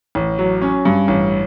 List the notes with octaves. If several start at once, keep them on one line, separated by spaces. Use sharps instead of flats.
A1
F#3
C#4
G2
A1